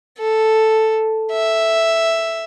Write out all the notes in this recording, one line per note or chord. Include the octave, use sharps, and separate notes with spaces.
A4
E5